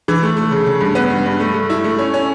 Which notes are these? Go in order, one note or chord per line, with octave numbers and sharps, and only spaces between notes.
E3
A3
A3
C#3
C#3
G2
B3
G2
G2
A3
A3
E4
A3
C#4
C#4